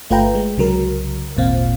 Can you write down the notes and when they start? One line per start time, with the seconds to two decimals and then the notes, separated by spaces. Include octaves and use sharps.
0.10 G1 A3 F4 B4 G5 A#5
0.35 G#3
0.57 C2 C#3 F#3 A#4
1.37 G#1 D#2 A#2 C4 F5